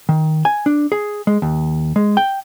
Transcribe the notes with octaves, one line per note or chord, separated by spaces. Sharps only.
D#3
G#5
D4
G#4
G#3
D#2
G#3
G5